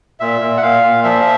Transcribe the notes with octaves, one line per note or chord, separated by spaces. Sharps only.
A#2 E5
A#2
F#5
A#2 F5
A#2
F3 E5